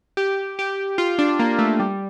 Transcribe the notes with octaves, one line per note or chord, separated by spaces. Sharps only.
G4
G4
F4
D4
A#3
A3
G3